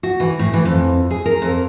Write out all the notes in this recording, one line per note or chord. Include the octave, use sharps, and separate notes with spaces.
F#4
E3
A2
E3
F2
G#4
A#4
F2